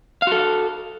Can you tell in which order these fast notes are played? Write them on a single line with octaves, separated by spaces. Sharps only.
F5 F#4 A4